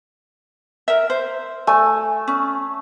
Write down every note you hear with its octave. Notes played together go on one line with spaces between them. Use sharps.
A#4 E5
C5
A3 G#5
C#4